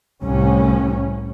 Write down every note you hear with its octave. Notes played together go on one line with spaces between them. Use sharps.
C2 A2 C#4